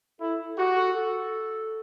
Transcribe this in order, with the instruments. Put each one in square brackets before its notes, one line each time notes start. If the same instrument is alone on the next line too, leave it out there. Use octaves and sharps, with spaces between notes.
[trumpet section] E4 [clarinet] A4
[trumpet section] F#4 [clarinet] G4
[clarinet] A4
A4